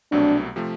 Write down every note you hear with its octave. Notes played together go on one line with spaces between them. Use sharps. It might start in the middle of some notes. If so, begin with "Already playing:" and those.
C2 B2 F#3 A3 C4 D4
C3 F3 A3